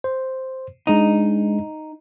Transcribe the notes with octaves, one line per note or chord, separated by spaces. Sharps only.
C5
G#3 D4 D#4